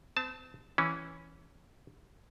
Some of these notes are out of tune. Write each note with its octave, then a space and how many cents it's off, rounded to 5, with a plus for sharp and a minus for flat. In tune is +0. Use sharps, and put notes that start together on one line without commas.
C4 -40 A5 -5
E3 +0 C#4 +0